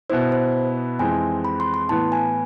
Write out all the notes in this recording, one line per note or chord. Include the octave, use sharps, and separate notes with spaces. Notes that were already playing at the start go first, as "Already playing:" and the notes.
B2 B3 E4 C5
C5
F2 E3 G#3 C4 G#5
B5
C6
C6
A2 E3 B3 A5
G#5